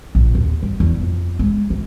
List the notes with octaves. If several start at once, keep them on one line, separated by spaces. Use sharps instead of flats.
A#1
D#2
G3
E2
F2
G#3
E3